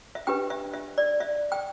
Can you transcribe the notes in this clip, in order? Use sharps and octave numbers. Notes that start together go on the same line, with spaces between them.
E5
D4 G4 B4 G5
E5
E5
D5
E5
G5